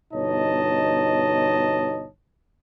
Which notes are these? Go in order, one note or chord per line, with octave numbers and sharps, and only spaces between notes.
G1 B2 D#4 C#5 D#5 A5